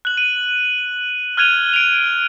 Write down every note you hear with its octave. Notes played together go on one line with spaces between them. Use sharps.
F#6 F#7
D#7
F6 F#6 G#6 D#7 F7 G7
D7 F7